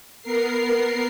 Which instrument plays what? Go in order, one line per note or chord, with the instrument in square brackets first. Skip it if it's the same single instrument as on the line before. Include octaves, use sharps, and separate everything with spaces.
[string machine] B3 A#4 C7